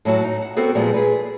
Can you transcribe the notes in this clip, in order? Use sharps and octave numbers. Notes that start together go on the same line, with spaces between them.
A2 F#3 F#4 A5
D#4
F#5
B3 C4 F#4 A4 C5
A#2 F3 G3 G#3 B3
G#4 B4